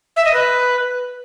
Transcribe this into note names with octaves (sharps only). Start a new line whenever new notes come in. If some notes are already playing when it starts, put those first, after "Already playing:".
E5
D#5
B4